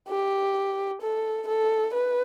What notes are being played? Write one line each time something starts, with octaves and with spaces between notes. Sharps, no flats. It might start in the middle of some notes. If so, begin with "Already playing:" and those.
G4
A4
A4
B4